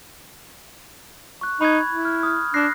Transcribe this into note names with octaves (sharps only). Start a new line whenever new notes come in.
C#6 F#6
D#4 B5 F#6 G#6
E4
F6
D#6 F6
D4 F#6 A#6 C7